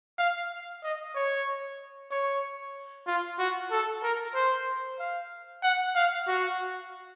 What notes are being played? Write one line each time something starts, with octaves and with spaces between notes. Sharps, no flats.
F5
D#5
C#5
C#5
F4
F#4
A4
A#4
C5
F5
F#5
F5
F#4